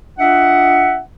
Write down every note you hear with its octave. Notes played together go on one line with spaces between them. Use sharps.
D4 F4 D#5 E5 F#5